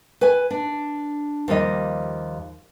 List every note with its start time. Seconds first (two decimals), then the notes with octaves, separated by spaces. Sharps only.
0.21 B4 G#5
0.51 D4
1.48 D#2 F3 G3 D#5